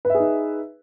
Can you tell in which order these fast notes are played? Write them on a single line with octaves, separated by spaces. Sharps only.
B4 E5 G#4 D#4